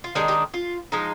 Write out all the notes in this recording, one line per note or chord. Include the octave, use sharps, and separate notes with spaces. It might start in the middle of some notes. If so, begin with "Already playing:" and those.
F4
D#3 G#3 D4 D#4 G4
D#4 G4
F4
F3 G#3 D#4